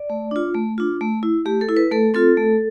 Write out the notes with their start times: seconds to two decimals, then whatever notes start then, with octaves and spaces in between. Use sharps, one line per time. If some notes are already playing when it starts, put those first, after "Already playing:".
Already playing: D5
0.10 A3
0.31 D4 F4
0.54 A3
0.78 D4 F4
1.01 A3
1.23 E4
1.46 A3 G4
1.61 A4
1.69 E4
1.77 B4
1.92 A3 A4
2.14 C4 F4 A4
2.37 A3